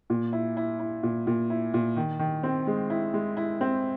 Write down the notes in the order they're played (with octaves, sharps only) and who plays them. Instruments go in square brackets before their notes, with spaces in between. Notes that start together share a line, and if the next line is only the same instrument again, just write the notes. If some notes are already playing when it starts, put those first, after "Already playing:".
[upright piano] A#2
E4
E4
E4
A#2
A#2
E4
A#2
D#3
D#3
C4
G#3
E4
G#3
E4
C4